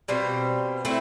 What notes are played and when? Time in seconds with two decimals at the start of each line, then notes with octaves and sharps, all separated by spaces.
0.08 B2 G3 C4 F4
0.85 A3 C4 E4